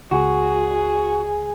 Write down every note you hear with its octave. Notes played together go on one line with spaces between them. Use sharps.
C#2 F#4 G#4